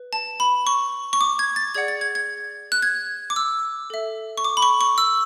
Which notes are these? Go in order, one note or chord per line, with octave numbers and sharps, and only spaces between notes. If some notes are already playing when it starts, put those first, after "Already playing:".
Already playing: B4
A5
B5
C#6
C#6
D6
G#6
A6
G#4 D5 F#5 G#6
A6
G#6
G#6
F#6
G#6
D6
E6
A4 E5
C#6
D6
B5
C#6
C#6
E6